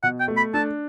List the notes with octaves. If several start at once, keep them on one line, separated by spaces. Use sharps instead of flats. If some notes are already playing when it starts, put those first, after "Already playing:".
B2 F#5
G5
A3
B5
D4 A5